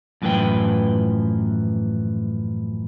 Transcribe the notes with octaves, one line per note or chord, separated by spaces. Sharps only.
F#2 A2 E3 F3 B4 G5